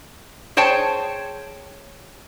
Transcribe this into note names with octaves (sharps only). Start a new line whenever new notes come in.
G#4 C5 C#5 G5 A5